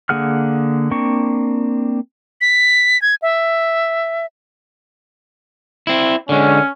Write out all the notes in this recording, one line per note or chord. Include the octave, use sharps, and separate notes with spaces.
D3 A#3 G#4 F#5 F6
A#3 C4 D4 C#6
B6
G#6
E5
C4 E4
D3 G#3 C#4